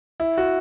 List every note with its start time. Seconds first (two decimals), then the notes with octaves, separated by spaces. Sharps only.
0.20 E4
0.38 F#4